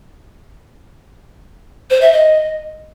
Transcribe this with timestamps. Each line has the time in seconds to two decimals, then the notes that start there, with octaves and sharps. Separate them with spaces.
1.90 C5
2.01 E5
2.13 D#5